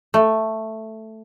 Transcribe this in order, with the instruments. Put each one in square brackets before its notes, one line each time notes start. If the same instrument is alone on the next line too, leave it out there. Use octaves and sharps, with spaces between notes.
[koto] A3